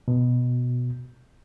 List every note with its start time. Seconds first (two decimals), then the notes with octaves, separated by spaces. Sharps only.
0.08 B2